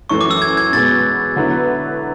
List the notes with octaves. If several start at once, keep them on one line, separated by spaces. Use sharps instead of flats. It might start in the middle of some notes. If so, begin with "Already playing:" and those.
F#2 E3 A3 C#6
D6
E6
G#6
G#6
B2 G#3 B3 A6
D3 F#3 B3 E4 B4